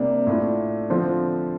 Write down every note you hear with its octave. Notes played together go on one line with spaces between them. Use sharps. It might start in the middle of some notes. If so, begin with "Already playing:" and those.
Already playing: C3 G3 A#3 D4
A2 A3 D4 F4
D3 F3 C4 F4